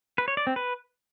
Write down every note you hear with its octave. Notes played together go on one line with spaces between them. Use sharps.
B4
C#5
D5
C4
B4